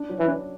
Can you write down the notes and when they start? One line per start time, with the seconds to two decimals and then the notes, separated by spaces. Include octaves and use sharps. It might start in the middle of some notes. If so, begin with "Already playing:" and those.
Already playing: D4
0.09 F#3
0.19 E3
0.28 D4